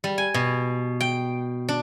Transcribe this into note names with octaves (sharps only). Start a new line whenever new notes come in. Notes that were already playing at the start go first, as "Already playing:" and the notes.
G3
G#5
B2
G5
D4